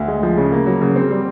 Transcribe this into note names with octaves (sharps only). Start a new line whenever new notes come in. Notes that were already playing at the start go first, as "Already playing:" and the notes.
Already playing: D2
G#3
F3
C#3
A#3
F#3
C#3
C4
G3